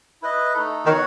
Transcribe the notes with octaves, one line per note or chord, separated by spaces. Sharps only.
E4 B4 D#5
A3 D#4 A4
D#3 B3 F#4 C#5 F#5